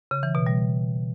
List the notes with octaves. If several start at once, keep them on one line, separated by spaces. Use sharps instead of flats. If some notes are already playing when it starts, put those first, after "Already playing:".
C#3
E3
B2
G3